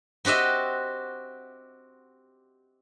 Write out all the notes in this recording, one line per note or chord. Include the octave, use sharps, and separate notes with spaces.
C4 F#4 G4 D#5 E5